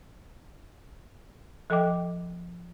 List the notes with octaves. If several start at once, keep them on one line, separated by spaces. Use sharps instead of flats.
F3 A4 D#5 G5 D6